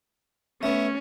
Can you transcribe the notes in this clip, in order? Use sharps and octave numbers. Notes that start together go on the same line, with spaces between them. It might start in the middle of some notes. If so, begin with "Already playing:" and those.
A3 B3 C#4